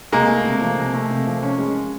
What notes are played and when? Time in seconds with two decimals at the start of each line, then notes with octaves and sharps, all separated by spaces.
0.12 C3 G#3 A#3
0.28 A3
0.44 C3
0.61 F3
0.78 C3
0.94 A3
1.10 C3
1.27 F3
1.43 C#4
1.59 G#3